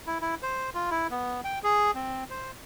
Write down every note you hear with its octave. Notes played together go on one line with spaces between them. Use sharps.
E4
E4
C5
F4
E4
B3
G5
G#4
C4
C5